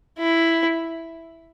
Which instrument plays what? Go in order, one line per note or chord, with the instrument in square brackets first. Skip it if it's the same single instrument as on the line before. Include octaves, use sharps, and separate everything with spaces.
[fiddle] E4